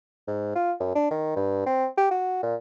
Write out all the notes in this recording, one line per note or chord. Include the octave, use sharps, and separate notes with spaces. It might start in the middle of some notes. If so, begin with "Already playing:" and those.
G#2
F4
F#2
D4
D#3
G2
C4
G4
F#4
A#2